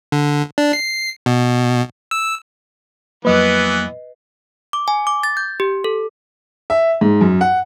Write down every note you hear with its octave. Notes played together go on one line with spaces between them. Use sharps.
D3
D4
C7
B2
E6
F2 E3 F#3 A#3 B3 B4 D#5
D6
G#5
D6
A6
G6
G4
A4
E5
G#2
F#2
F#5